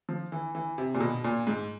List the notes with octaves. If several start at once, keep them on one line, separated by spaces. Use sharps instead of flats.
F3
E3
E3
C3
A#2
B2
A#2
G#2